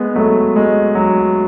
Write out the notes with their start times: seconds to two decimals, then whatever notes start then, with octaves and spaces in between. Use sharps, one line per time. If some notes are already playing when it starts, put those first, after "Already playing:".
Already playing: G#3 B3
0.16 F#3 A3
0.56 G#3
0.95 F#3